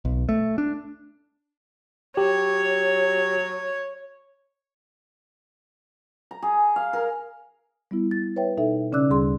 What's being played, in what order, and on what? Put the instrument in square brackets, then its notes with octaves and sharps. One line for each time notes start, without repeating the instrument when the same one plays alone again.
[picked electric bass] B1
A3
D4
[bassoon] F#3 [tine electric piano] G4 [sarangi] C#5
[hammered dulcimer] A#5
G#4
F5
A#4
[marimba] G3 B3 E4
A6
B4 C#5 E5 G5
B2 D#4 A4 E5
C#3 C#4 D5 D6 E6 F#6
D2 G3 G#4 C6